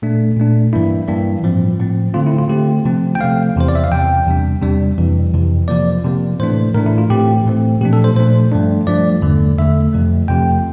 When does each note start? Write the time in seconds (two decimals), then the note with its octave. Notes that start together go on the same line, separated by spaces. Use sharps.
0.02 A#2 A3 D4
0.37 A#2 A3 D4
0.73 G2 E3 A#3 D4 E4
1.08 G2 E3 A#3 D4
1.43 A2 F3 C4
1.79 A2 F3 C4
2.14 D3 A3 C4 F4
2.26 E4
2.38 F4
2.49 D3 A3 C4 G4
2.85 C3 F3 A3 C4
3.15 G5
3.20 C3 F3 A3 C4 F5
3.56 E2 C3 E3 C5
3.68 D5
3.75 E5
3.84 F5
3.91 E2 C3 E3 G5
4.27 E2 C3 G3 D4
4.62 E2 C3 G3 D4
4.98 F2 C3 E3
5.34 F2 C3 E3
5.68 C3 F3 A#3 D5
6.04 C3 F3 A#3
6.40 A2 E3 A3 D4 C5
6.74 A2 E3 A3 D4 A#4
6.86 E4
6.98 F4
7.10 A2 E3 A3 C4 G4
7.46 A2 E3 A3 C4
7.81 A#2 F3 A3 D4 G4
7.93 A4
8.04 C5
8.16 A#2 F3 A3 D4 C5
8.52 G2 F3 A3 D4
8.87 G2 F3 A3 D4 D5
9.22 E2 D3 A3
9.58 E2 D3 A3 E5
9.93 F2 C3 F3 A3
10.28 F2 C3 F3 A3 G5